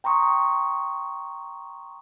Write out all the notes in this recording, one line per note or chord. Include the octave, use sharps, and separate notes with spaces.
G5 A#5 C6 C#6 D#6